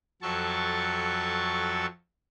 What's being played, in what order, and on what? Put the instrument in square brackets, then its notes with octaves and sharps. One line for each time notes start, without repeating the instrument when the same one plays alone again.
[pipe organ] F2 F#3 A4 A5 C#6